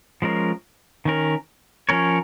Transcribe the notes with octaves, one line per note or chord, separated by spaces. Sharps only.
F3 G#3 C#4 A#4
D#3 C#4 A#4
F3 C#4 A#4 C#5